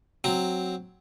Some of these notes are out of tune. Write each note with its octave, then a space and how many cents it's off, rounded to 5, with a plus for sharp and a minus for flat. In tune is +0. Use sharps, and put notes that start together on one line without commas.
F#3 +0 C4 +0 A#5 -15